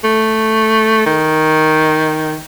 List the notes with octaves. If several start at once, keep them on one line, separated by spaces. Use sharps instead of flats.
A3
D#3